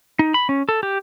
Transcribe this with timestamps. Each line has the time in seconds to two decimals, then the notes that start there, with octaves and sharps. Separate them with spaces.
0.19 D#4
0.34 B5
0.49 C#4
0.69 A4
0.83 G4